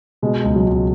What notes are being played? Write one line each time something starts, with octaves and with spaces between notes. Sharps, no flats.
B2 G#3
C#2
F#3
C#2